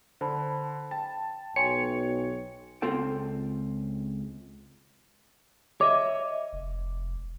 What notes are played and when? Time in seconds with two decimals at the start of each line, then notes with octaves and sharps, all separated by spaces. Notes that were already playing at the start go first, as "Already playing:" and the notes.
0.21 D3 C5 A5 B5
0.91 G5 A5
1.56 B1 C#5 G5 G#5 C6 C#7
2.82 C#2 C4 F4 A4 G5
5.81 C#5 D#5 E5 D6
6.53 F1